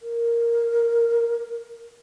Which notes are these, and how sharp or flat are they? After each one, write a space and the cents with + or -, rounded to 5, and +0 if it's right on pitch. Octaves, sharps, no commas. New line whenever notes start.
A#4 +0